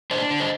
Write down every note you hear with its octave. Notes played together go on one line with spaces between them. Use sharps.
D4 C5 D#5
D3
C5 D#5